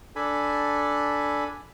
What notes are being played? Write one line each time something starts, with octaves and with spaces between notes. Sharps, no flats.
D4 A4 G#5 B5